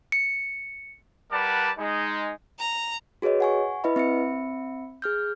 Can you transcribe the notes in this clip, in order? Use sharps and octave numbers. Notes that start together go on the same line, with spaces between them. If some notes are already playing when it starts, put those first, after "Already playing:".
C#7
G3 A#4 B4 D5 F#5 A5
G#3 D#4
A#5
F#4 G#4 B4 C#5 D#5
F#5 G#5 C#6
E4 B4 D#5 E5 B5
C4 E5 B5 C#7
G#4 F6 G6